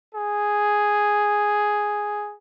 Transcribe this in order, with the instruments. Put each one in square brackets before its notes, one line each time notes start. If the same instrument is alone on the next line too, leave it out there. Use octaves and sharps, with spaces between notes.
[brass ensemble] G#4